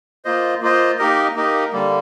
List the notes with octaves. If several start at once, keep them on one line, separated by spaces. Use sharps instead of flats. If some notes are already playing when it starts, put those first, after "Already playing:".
A#3 F4 C5 D#5
A#3 F4 C5 D#5
A#3 D#4 G4 A#4 D#5
A#3 D#4 G4 A#4 D#5
D3 G3 A#3